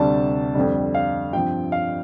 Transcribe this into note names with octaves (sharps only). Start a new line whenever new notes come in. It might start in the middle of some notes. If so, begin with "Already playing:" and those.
Already playing: D2 C3 G3 D4 A5
F2 D3 G3
F5
G2 F3 C4 G5
F5